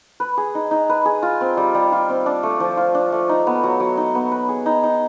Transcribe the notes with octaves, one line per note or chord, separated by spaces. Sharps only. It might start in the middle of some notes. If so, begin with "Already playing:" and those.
B4
G#4
D#4
D#4
B4
G#4
F4
C4
G3
G3
F4
C4
D4
A3
F3
F4
D4
A3
D#4
B3
F#3
F#3
D#4
B3
B4
G#4
D#4
D#4